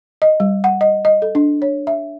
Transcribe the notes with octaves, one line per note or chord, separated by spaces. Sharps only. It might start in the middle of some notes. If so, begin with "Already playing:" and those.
D#5
G3
F#5
D#5
D#5
A4
D4
C#5
E5